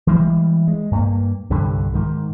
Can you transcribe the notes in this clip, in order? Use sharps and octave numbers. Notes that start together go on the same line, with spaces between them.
E3 G3 G#3
G#3
G2 A#3
C2 G2 D3 G3
G#2 D#3